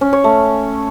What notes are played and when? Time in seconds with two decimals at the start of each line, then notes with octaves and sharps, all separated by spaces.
0.01 C#4
0.13 C#5
0.24 A3